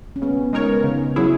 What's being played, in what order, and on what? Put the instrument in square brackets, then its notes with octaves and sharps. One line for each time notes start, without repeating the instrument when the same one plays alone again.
[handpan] C#4
[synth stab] C#3 [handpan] B3
[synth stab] G#3 D#4 A#4 C#5
C#3
F#3 C#4 E4 G#4